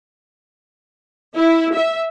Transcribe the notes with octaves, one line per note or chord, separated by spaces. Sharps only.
E4
E5